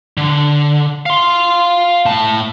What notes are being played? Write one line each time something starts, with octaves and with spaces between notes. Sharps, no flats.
D3
F5 C6
A2 A5